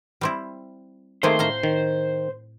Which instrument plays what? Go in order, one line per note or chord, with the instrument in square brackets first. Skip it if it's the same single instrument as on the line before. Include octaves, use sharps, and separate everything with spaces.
[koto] G3 C4 E4
[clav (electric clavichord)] D#3 A3 [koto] A#3 C4 G#4 [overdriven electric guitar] C5
[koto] A2 F5 A#5
[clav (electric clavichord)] D#3